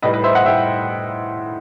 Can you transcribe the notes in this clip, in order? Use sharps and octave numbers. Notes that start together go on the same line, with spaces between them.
A2 G3 D#4 B4 D#5
B4 D#5
C5 E5
D#5 F#5
A2 G3 D#4 E5 G5